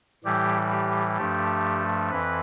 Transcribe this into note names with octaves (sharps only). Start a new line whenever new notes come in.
A2 E3 G3 G4
G4
G2 F3 A3 G4
F2 E3 B4